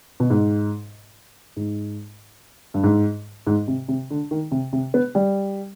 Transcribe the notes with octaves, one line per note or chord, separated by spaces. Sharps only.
B2
G#2
G#2
G2
G#2
G#2
C3
C3
D3
D#3
C3
C3
B3
G3